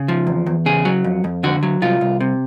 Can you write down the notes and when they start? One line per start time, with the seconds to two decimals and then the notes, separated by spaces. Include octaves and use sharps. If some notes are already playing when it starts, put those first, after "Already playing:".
Already playing: C#3
0.08 F3
0.27 E2
0.46 E2
0.66 C#3 G#4
0.85 F#3
1.04 F2
1.24 F2
1.43 D3 F#4
1.63 F#3
1.82 C2 F4
2.01 C2
2.20 C3